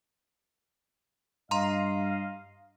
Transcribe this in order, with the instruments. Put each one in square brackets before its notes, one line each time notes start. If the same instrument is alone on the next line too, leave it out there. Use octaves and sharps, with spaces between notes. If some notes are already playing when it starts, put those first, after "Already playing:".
[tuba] G2 [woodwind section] D#5 F5 [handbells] A#5 C6